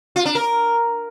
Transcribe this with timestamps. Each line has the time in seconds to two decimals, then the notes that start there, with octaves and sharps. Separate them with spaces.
0.16 F4
0.25 D4
0.35 A#4